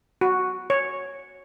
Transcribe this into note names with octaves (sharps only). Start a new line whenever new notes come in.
F#4
C#5